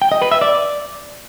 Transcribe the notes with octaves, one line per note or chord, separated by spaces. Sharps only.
G5
D#5
B4
E5
D5